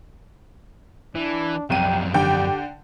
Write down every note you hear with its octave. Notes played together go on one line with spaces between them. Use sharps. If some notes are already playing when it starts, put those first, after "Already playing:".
E3 D4
C2 F#2 F3 G5 D#7
D3 G4 G5